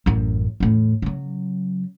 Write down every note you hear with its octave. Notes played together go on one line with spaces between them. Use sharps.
A1 F#2
E2 A2
C#3 F#3